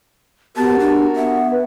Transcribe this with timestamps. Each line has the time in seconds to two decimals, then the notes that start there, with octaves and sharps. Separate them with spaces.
0.57 B3 F#4 G4 A#4 A5
0.79 D4
1.16 B3 E5 F#5
1.51 B4